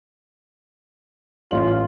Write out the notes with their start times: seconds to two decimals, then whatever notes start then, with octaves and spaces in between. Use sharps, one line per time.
1.51 A1 F4 C#5 F#7